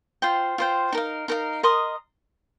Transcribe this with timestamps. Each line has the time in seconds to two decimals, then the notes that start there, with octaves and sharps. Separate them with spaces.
0.22 F4 C5 G5
0.58 F4 C5 G5
0.92 D#4 A#4 F5
1.28 D#4 A#4 F5
1.63 A#4 D#5 C6 D#6